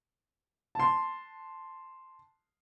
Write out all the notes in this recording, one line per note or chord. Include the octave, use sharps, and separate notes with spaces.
A5 C6